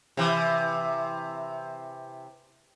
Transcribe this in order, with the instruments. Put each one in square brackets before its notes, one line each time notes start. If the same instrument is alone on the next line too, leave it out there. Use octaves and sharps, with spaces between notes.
[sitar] C3 E3